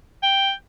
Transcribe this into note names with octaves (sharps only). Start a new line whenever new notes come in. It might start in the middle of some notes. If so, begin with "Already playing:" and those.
G5